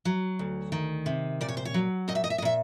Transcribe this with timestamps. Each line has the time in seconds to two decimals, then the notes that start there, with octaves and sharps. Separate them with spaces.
0.05 F#3
0.39 D2
0.72 D#3
1.06 C3
1.41 A#2 D5
1.49 C#5
1.57 C5
1.65 C#5
1.74 F#3
2.08 A#2 D#5
2.15 E5
2.24 D#5
2.30 E5
2.38 D#5
2.42 A#2 E5